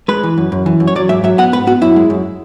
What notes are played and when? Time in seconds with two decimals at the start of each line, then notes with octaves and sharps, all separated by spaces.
0.08 G#3 B4
0.23 E3
0.38 F#2
0.52 F#2
0.66 E3
0.80 F#2
0.88 C#5
0.96 F#3 D5
1.09 G#2 E5
1.24 F#3 E5
1.38 B3 F#5
1.52 G#2 B4
1.67 B3 F#4
1.81 F#2 E4
1.96 G#3
2.10 F#2